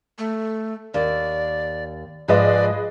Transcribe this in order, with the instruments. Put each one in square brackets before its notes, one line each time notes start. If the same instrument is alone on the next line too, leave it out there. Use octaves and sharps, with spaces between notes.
[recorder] A3
[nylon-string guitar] D#2 [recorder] D5
[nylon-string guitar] G#2 F3 G#3 [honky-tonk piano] G#4 B4 D#5 [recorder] D5